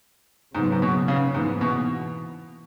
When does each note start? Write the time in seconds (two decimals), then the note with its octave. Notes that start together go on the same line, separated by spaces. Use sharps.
0.55 G#2 C#3 F#3 B3
0.72 G#2
0.82 B2
1.08 C#3
1.34 G#2 E3 B3
1.61 B2